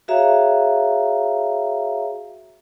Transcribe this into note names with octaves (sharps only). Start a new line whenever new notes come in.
F#4 G#4 C#5 E5 F5 A#5